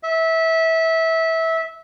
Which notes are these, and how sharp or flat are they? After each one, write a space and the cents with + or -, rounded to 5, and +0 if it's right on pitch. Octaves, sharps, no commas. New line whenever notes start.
E5 -20